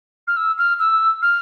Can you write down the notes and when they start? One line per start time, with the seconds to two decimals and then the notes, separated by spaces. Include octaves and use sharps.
0.27 F6
0.36 E6
0.58 F6
0.79 E6
1.22 F6